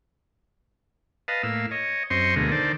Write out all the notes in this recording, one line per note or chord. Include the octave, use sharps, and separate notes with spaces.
B4 D#5 F5 A5
A2 A#3 F5 E6
C#5 D#5
F#2 C4 C5 D#5 C6 C#6
D2 B2 D3 G#3 A#3 D#5
D3 D#3 A4 C5 D5